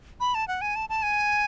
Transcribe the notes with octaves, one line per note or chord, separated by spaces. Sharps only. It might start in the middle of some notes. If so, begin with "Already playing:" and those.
B5
A5
F#5
G#5
A5
A5
G#5